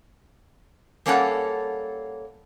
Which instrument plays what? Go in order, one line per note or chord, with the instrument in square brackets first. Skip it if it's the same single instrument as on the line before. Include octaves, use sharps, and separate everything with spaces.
[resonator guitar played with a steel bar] G3 A#3 C#4 A4 D5 F#5